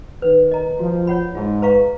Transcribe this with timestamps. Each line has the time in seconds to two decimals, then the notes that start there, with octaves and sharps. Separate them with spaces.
0.22 D#3 B4
0.51 D#5 A#5
0.79 F3 F#4
1.07 C#5 F#5 B5
1.35 G#2 F4
1.62 B4 F5 A#5 C#6